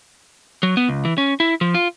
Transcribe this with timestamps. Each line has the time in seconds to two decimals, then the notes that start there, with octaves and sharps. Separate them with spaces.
0.63 F#3
0.77 B3
0.89 C#2
1.05 E3
1.18 C#4
1.40 E4
1.61 F3
1.74 F4